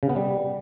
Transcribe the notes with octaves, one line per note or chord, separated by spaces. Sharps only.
C#3
B3
G3